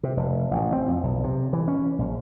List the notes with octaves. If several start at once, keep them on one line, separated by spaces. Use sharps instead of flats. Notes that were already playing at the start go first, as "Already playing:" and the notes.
C3
F1
A1
C4
F2
B1
C3
E3
C#4
A#1